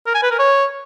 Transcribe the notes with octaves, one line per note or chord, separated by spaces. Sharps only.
A#4
G#5
B4
A#4
C#5